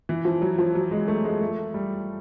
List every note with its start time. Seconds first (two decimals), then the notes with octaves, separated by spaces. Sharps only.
0.09 E3
0.25 F3
0.42 F#3
0.58 F3
0.75 F#3
0.91 G#3
1.08 A3
1.25 G#3
1.41 A3
1.74 G3